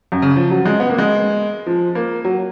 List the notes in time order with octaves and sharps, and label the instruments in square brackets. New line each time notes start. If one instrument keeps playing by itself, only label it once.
[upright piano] F#2
C#3
F3
F#3
G#3
B3
A#3
G#3
F3
A#3
F#3